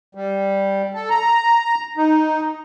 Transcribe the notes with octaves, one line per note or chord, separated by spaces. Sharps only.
G3
A4
A#5
D#4